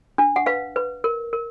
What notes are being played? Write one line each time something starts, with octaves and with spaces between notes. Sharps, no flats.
D4
F#5
B4 F5
B4
A#4
A#4